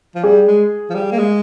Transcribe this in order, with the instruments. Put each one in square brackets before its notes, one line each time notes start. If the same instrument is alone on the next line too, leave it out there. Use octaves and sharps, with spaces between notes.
[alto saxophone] F3
[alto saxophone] G3 [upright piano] G#4
[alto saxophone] G#3
F3
G3
A#3
G#3